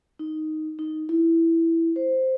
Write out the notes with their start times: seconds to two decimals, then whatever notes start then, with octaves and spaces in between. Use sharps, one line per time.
0.19 D#4
0.79 D#4
1.09 E4
1.96 C5